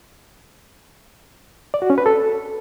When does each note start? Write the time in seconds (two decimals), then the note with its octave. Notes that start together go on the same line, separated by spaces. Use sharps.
1.74 D5
1.82 F#4
1.90 C#4
1.98 B4
2.06 A4